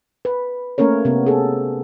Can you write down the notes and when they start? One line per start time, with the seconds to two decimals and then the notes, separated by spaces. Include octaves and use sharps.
0.25 B4
0.78 A3 A#3 C#4 A#4 C#5
1.05 C3 B3
1.26 G#4 A4